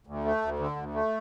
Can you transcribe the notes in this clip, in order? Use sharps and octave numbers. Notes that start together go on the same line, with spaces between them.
D2
A3
D2
D3
D2
A3